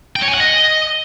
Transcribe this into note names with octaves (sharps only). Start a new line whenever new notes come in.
G5
C#5
G#5
F#5
D#5